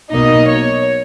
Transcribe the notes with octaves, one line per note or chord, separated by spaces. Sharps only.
B1 B2 A#3 D#4 D#5
C#5